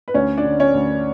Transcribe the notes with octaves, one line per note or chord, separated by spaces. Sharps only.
B4
D2 C#4 C#5
D4 D5
D3
C#4 C#5
D2